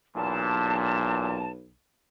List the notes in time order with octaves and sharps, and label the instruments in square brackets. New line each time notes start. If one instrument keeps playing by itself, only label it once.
[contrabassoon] B1 [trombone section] E2 A#2 [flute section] A5